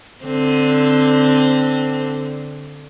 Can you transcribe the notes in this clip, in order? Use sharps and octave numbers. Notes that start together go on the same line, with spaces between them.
D3 C4